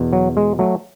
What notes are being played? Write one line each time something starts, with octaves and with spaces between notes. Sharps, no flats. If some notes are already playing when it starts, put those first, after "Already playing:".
Already playing: E2 B2
F#3
G#3
F#3 A3